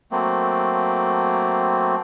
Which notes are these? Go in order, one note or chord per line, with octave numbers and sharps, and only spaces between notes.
F#3 A3 A#3 C4